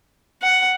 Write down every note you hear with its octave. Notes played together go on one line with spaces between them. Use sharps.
F#5